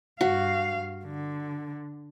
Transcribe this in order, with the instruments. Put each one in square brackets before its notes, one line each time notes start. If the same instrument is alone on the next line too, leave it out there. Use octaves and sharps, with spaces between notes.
[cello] G2 F5 [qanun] F#4
[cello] D3